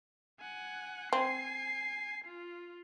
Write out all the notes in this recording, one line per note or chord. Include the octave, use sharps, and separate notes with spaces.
F#5 G#5
C4 G#5 C7
F4